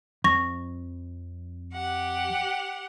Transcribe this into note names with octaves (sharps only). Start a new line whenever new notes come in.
F2 C#6 A#6
G4 F#5